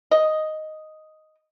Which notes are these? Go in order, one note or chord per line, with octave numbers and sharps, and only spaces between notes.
D#5